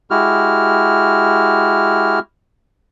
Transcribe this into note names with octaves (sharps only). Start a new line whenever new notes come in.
G#3 E4 F#4 G4 F6